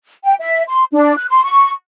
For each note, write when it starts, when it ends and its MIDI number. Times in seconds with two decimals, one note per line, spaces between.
0.24 0.34 79
0.40 0.63 76
0.68 0.84 84
0.93 1.14 62
1.17 1.25 90
1.29 1.44 84
1.44 1.70 85